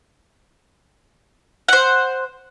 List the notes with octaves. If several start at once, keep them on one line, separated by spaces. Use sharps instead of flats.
C5 F#5